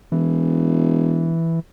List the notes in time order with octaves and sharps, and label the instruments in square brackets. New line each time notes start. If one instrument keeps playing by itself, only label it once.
[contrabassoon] E1 [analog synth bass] E3